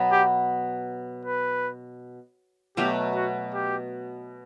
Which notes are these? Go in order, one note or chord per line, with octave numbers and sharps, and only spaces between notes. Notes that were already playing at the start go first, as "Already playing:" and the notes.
Already playing: B2 F#3 B3
G4
B4
B2 F#3 A3 G4
F#4
G4